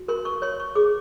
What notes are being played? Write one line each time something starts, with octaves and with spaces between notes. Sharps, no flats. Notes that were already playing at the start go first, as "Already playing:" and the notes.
Already playing: F#4
A#4 C6
C#6
C#5 C6
C#6
G#4 D6